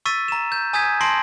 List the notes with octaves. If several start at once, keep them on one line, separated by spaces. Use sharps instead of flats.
C#6 E6 A6 B6 D#7
A#5 E7
G6
G#5 D#6 G6 G#6 B6
A5 C6 A#6 C7 D7 F#7